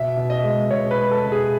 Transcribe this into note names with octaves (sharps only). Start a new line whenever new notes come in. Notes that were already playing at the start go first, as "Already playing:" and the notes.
Already playing: B2 E5
B2
D#5
G#3
B2 C#5
B4
G#3
A4
B2
G#4